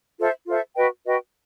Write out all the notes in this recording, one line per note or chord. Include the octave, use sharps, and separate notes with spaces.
F4 A4 C5 E5
F4 A4 C5 E5
F#4 B4 D#5 G5
F#4 B4 D#5 G5